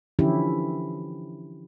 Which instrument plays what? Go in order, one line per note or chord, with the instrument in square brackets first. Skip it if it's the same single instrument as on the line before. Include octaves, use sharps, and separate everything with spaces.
[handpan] D3 E3 F3 C#4 E4 G4